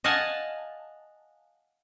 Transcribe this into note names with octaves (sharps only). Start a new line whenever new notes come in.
D#5 F5 F#5 G#5 A5